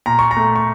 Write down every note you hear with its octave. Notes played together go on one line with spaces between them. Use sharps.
A#2 A#5
C#6
A#5
A3
C#6